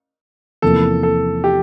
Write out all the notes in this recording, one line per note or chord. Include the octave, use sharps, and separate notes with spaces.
E2 C3 F3 A#3 E4 A4
A4
G4